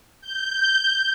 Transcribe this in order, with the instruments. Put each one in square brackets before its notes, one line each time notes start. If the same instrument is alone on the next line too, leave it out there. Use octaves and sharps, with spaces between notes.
[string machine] G6